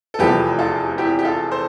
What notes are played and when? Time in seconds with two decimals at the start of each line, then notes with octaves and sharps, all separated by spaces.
0.14 A4
0.19 F1 E2 C3 F3 A3 G4 B4
0.59 F4 A4
0.98 E4 G4
1.19 G4
1.25 F4 A4
1.51 A4 C5